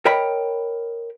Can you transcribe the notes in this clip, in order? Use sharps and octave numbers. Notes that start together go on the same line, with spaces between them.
A#4 C#5 D#5 G5 B5